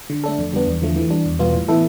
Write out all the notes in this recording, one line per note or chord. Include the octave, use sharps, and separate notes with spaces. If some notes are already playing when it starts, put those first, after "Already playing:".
D3
A3 D4 A4
F2
D3 G3 B3 D4
E2
D3 F3 A3
E3
G3 D4
E2
B2 G3 B3 F4
A2
E3 B3 E4 A4